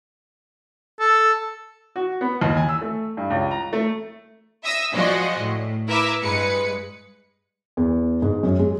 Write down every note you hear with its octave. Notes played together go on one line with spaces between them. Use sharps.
A4
F#4
B3
D#2
G#5
E6
A3
G2
C#2
A#5
A3
E5 D#6 E6 A#6
F3 G#3 F#4 D5 D#5
A2
E4 A#4 B4 E5 D6
G2 G#3 B4 C#7
E2
G#2
F#2
G#3